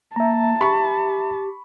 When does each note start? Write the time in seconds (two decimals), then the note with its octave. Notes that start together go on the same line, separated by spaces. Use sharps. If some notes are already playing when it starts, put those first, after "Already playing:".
0.16 A#3 E5 A5 A#5
0.61 G4 B5 C#6